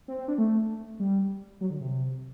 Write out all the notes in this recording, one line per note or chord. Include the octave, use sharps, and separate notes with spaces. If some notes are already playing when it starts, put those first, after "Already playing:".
C4
C4
D4
A3
G3
F#3
D3
C3